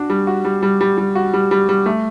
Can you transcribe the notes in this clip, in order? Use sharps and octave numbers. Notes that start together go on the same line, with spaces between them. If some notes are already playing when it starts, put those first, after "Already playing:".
Already playing: D4 F#4
G3
F#4
G3
G3
G3
G3
F#4
G3
G3
G3
A3